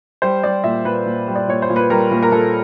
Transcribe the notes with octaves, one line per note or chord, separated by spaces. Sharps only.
G3 C5
G3 D5
A#2 E5
A#2 B4
A#2
G3
D5
A#2 C#5
C5
A#2
B4
G3 A#4
A#2
A#4
A#2 A4